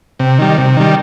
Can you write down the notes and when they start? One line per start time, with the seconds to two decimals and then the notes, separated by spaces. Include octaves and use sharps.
0.19 C3
0.39 D#3 G3
0.58 C3
0.77 D#3 G3